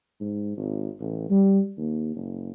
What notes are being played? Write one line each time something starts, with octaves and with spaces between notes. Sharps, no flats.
G#2
G#1
A1
G3
D#2
F#1